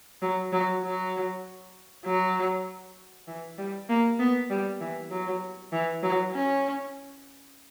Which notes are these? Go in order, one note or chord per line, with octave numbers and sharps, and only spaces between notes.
F#3
F#3
F#3
F#3
E3
G3
A#3
B3
G3
E3
F#3
E3
F#3
C#4